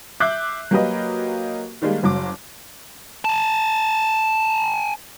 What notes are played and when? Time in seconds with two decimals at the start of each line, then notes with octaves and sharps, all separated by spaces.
0.20 E5 D6 F#6 G6 C7
0.71 F#3 A#3 G4 A#4 B4 D#5
1.82 D#3 G3 G#3 A#3
2.03 F#1 F#3 D6
3.25 G#5 A5